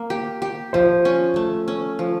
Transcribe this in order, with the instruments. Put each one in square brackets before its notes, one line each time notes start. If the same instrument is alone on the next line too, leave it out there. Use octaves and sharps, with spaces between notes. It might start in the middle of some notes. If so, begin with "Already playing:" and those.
Already playing: [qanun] A#3
G4
G4
[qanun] F3 [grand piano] C5
[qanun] C#4
A3
C#4
F3